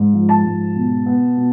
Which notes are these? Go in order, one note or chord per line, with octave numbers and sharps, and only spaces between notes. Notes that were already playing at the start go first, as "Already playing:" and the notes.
Already playing: G#2
F3
A5
G#2
B2
B3
B2